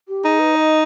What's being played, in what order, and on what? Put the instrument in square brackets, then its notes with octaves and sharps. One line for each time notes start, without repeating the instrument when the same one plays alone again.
[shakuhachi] G4
[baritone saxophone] D#4 [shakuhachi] G#4
[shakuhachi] B4
D#5